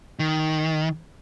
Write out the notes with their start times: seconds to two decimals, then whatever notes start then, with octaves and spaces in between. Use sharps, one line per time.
0.19 D#3